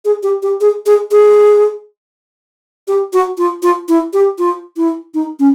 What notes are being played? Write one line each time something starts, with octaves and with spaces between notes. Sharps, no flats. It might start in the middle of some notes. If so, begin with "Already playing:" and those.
G#4
G4
G4
G#4
G#4
G#4
G4
F#4
F4
F4
E4
G4
F4
E4
D#4
C#4